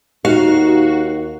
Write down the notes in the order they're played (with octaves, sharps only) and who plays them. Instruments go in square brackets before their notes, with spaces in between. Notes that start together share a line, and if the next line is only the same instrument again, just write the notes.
[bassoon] D#2 [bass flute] D#4 [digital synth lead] F#4 [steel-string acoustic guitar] F5